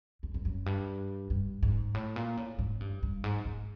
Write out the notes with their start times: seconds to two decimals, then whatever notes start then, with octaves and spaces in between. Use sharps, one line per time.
0.23 F2
0.34 F2
0.45 F#2
0.66 G2
1.30 G2
1.63 G#2
1.94 A2
2.16 A#2
2.37 A2
2.59 G#2
2.80 G2
3.03 G2
3.24 G#2
3.45 G#2